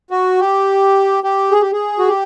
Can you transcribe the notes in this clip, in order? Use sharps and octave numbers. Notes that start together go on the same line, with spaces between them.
F#4
G4
G4
G#4
G4
G#4
F#4
G4